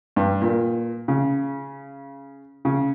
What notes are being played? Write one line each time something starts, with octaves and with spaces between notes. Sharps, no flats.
G2
A#2
C#3
C#3